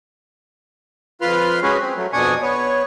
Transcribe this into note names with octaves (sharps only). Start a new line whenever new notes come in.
F2 F4 B4 C6 F6
G#3 C#4 F#4 G#4 B4
C4
F#3 A3
F2 B2 D4 G#5 C#6 D#6
B3 C#5